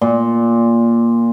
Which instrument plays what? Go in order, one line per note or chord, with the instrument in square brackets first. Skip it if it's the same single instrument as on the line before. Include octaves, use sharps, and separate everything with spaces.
[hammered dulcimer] A#2